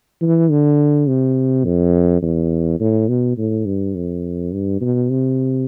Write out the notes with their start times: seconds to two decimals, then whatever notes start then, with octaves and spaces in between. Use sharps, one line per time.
0.21 E3
0.50 D3
1.07 C3
1.65 F2
2.22 E2
2.80 A2
3.09 B2
3.38 A2
3.66 G2
3.96 F2
4.52 G2
4.81 B2
5.10 C3